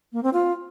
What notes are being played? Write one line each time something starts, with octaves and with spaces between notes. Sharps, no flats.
A#3
C4
F4